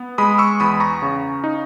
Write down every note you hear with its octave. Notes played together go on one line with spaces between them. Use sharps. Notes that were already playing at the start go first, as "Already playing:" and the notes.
Already playing: B3
G#3 B5 D#6
C#6 E6
E2 B5 D#6
A#5 C#6
C#3
D#4